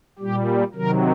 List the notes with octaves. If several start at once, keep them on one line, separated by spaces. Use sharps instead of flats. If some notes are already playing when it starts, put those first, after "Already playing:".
A#2 G3 G4
C3 D#3 F#3 A#4